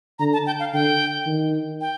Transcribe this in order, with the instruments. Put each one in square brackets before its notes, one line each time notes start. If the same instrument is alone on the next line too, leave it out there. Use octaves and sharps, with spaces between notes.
[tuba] D3 [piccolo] A#5
[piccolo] A5
G5
F5
[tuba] D3 [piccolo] G5
[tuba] D#3
[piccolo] G5